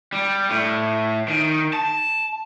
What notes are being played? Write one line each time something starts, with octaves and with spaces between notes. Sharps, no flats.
G3
A2
D#3
A5